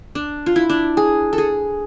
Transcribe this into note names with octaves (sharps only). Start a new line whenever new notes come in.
D4
F4
E4
D4
G#4
A4
G#4